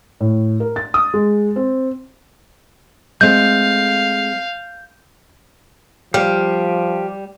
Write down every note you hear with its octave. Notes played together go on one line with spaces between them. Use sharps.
A2
A#4
A6
D#6
G#3
C4
G#3 A3 C4 F5 G6
F3 G3 G4 F5